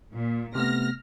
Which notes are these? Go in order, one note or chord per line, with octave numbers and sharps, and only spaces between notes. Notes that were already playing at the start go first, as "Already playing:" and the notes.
A#2
C3 A3 B3 F6 A#6